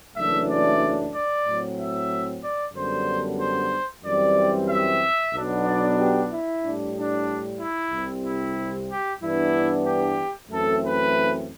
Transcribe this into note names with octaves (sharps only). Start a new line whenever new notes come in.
F#1 F#2 E3 A3 D4 E5
D5
D5
A2 F#3 C4
E5
D5
F#2 D3 G3 B3 D4 C5
C5
F#2 E3 G3 C4 D5
E5
B1 B2 F#3 B3 D4
D5
G4
E4
A2 G3 D4
D4
E4
C2 C3 G3 C4
E4
G4
G2 E3 B3 D4 E4
G4
F#2 E3 A3 C4 A4
B4